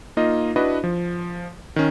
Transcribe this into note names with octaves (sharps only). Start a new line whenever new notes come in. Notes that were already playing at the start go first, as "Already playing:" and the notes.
A#3 D#4 F4 D#5
D4 E4 F#4 B4 D#5
F3
D#3 C#4